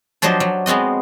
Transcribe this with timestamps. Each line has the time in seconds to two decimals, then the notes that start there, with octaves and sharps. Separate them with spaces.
0.22 F3 F#3 D4 G4 C5 D#5
0.40 F#3
0.66 G#3 B3 C4 F#4 D#5